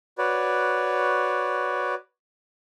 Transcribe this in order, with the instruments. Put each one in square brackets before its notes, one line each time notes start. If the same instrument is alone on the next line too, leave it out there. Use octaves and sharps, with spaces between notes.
[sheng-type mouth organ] F#4 B4 C#5 D5